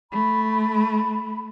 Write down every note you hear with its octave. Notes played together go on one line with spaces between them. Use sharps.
A3 B5